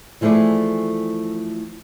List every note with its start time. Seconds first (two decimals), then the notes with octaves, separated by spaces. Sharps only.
0.21 E3 F3 A3 E4 G#4 D5